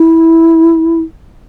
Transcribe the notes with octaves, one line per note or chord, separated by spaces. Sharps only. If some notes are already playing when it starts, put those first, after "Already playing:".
Already playing: E4